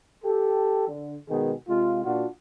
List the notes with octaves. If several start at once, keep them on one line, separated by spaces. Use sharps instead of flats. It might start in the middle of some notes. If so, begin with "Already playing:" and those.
G4 A4
D3
B2 D#3 G#3 B3 G#4
C3 G#3 F4
A#2 D4 F4 F#4